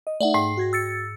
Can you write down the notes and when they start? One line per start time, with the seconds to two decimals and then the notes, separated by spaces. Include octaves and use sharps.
0.07 D#5
0.20 A3 D#4 D5 E5 F#5
0.34 G#2 G5 C7
0.57 F#4 G#6 A#6
0.73 E6 A6 C#7